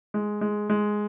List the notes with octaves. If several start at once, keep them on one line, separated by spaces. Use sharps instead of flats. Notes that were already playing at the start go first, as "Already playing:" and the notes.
G#3
G#3
G#3